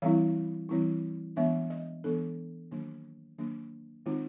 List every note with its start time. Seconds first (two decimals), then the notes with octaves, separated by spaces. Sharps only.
0.02 E3 G3 C4 E4 F5
0.69 E3 G3 C4 E4
1.36 E3 G#3 B3 D4 E5
1.70 D#5
2.04 E3 G#3 B3 D4 A4
2.71 D#3 F#3 A#3 D4
3.38 D#3 F#3 A#3 D4
4.06 D#3 G#3 C4 D#4 F4